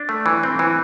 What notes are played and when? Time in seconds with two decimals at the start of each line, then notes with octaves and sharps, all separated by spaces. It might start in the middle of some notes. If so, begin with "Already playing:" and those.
Already playing: D4
0.09 A3
0.26 E3
0.43 C4
0.59 E3